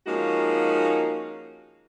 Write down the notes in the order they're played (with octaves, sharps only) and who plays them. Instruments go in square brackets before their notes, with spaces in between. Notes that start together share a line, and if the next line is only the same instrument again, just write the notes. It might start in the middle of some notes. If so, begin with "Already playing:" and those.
[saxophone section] F3 G#3 A#3 C#4 D#4 F#4